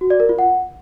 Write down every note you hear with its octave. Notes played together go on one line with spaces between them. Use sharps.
F#4
D5
A#4
F4
F#5